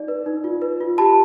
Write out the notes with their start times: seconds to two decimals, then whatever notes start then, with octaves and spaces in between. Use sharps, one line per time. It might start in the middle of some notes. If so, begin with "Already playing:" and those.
Already playing: D#4 D5
0.08 B4
0.26 D#4
0.44 F4
0.62 B4
0.81 F4
0.98 G4 A5 B5